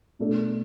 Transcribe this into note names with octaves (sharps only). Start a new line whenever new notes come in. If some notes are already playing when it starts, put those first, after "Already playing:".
B2 A3 D4 A4 D5